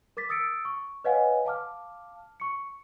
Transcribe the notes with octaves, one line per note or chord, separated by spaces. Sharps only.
A#4 D6 A6 B6
D#6 E6 A6 C#7 D7
C#6
B4 C#5 D#5 F5 F#5 G#5
F5 A5 D6 F6
C#6 C#7